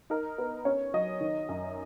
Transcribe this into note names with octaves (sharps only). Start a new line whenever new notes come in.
D#4 A#4
B3
C#4 C#5
F#3 D#5
D#3
F#2